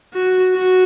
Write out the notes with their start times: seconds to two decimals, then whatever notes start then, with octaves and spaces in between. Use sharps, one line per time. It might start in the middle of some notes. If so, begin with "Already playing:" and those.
0.13 F#4
0.55 F#4